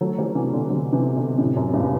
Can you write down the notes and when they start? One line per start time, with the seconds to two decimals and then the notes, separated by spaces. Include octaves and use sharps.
0.01 F#3 A3
0.18 E3 G3
0.35 C3 E3
0.53 B2 D3
0.69 D3 F#3
0.93 C3 E3
1.16 B2 D3
1.38 A2 C3
1.56 F#2
1.73 E2 G2